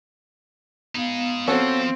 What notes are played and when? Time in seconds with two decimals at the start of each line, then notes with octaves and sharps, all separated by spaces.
0.95 B3 D#4 G#4 F5
1.47 F3 C4 C#4 F#4 A4